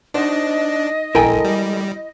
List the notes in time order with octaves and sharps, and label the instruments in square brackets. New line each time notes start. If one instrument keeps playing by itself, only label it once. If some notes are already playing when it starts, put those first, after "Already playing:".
[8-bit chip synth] D4 [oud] D#4 F#4 C5 [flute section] D#5
[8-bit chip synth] A#1 [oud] G#3 A4 A#4 [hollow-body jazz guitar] E4 G5 G#5
[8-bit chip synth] G3